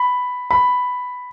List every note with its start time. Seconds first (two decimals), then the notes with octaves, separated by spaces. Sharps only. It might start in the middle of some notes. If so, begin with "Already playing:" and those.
Already playing: B5
0.51 B5